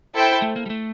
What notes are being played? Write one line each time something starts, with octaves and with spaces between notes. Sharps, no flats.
E4 A4 C5 G5
A3
A#3
G3
A3